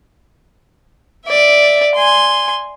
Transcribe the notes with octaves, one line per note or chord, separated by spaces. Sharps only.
D5 E5
G#5 C6